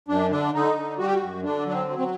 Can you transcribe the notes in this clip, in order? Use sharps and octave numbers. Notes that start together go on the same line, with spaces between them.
F#2 D4
D3 D4
D3 D#4
D3
G3 F#4
G4
F#4
F#2
D3 D4
F#3 D4
C4
F#3
C4